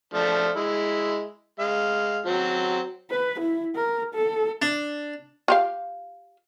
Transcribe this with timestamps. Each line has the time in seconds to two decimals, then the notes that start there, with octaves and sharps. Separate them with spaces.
0.14 F3 A3 D4
0.55 G#3 E4
1.59 G#3 F5
2.26 F#3 C4
3.10 B4
3.40 E4
3.76 A#4
4.14 A4
4.62 D4
5.48 F4 G4 F5